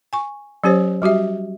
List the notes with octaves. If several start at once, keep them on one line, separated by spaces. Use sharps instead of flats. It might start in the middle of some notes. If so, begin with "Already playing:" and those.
G#5 C#6
F#3 C#4 G4 C5 C#5
G3 F#4 G4 E5